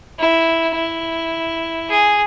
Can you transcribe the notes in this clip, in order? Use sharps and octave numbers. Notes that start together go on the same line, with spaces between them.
E4
E4
G#4